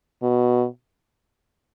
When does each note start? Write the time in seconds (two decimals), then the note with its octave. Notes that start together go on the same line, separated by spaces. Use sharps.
0.22 B2